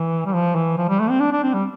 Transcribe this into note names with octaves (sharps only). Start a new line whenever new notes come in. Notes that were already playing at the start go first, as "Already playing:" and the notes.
Already playing: E3
G3
F3
E3
F3
G3
A3
C4
D4
D4
C4
G3